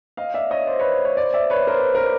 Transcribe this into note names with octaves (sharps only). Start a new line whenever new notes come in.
D#5 F5
D5 E5
C#5 D#5
C5 D5
B4 C#5
B4 C#5
C5 D5
D5 E5
B4 C#5
A#4 C5
B4
A#4